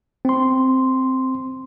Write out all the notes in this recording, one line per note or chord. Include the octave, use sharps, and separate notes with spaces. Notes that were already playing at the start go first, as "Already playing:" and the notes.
C4 C6